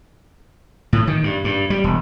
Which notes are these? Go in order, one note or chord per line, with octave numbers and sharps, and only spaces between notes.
A2
D#3
G2
G2
G3
E1